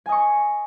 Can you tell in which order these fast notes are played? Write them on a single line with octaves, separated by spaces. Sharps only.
G#5 D#5 C#6